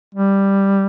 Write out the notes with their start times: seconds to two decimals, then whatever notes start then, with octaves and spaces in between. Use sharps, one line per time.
0.15 G3